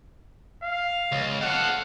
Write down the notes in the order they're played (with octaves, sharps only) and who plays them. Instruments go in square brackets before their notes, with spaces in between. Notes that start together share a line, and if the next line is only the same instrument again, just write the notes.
[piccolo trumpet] F5
[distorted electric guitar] C#2
[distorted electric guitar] A4 F5 [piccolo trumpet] F#5